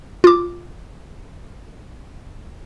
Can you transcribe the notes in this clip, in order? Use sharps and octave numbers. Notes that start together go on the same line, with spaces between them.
F4 D6